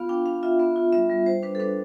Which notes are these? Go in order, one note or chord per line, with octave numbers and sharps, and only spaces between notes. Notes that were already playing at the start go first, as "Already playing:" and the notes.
Already playing: B3 F4 F5
D4 G5
D4 F5
F4 E5
B3 E5
F4
G3 E5
G3
G3 C5
D4 B4
A4
D4 B4